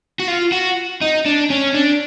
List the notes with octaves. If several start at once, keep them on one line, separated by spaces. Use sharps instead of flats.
F#4
F4
F#4
D#4
D4
C#4
D4